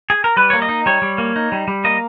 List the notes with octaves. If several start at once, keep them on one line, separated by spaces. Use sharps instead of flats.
G#4
A#4
G3 B4
A#3 C#5
D#5
D#4
G3 C#5
G3
A#3
D#4
G3
G3
A#3 D#5